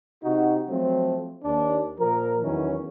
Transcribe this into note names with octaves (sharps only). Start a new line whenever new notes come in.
C3 D#4 F#4
F3 F#3 A3 C4
D#2 D4
A#2 F3 A#4
E2 D#3 E3 F#3 C#4